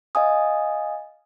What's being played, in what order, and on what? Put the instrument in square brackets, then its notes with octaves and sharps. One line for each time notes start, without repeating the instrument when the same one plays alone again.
[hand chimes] D#5 F5 G#5 D#6